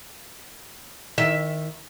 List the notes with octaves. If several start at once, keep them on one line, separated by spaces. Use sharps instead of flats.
D#3 E5